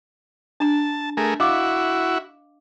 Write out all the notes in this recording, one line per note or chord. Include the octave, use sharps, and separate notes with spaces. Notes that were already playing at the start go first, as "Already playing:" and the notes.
D4 A5 A#5
A3 G#4 A#4
E4 F#4 D#5 F5 D6